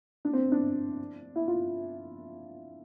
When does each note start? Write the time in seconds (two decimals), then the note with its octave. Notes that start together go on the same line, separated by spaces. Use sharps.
0.25 D4
0.33 C4
0.52 D4
1.36 E4
1.48 F4